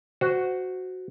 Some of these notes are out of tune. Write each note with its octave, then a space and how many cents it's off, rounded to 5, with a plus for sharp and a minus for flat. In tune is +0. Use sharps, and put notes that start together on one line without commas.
F#4 +0 C5 -20